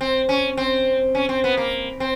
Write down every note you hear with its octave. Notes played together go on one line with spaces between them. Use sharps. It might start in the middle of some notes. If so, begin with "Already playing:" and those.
C4
C#4
C4
C#4
C4
B3
A#3
C4